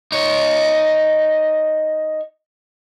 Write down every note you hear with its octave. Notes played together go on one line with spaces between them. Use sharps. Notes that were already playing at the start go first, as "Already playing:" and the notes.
D#4 C#5